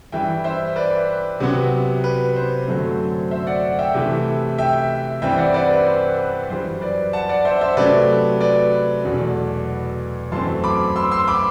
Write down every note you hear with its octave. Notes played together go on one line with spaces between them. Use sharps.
G2 E3 G3 E5 G5
C5 E5
B4 D5
C3 F#3 B3
B4
C5
F#2 D3 F#3 A3 C4
C5 E5
D5 F#5
E5 G5
C3 E3 A3
E5 G5
G2 E3 G3 C4 E5 G5
D5 F#5
B4 D5
B4
C5
B4
F#2 E3 G3 C5
B4 D5
F#5 A5
D5 F#5
C5 E5
C5 E5
C3 F#3 A3 B4 D5
B4 D5
E2 B2 F#3 A3
F#2 E3 A3 C4 A5 C6
B5 D6
C6 E6
C6 E6
B5 D6